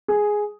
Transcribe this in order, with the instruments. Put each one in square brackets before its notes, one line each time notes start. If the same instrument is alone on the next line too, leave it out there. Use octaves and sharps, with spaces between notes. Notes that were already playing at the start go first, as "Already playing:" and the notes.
[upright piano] G#4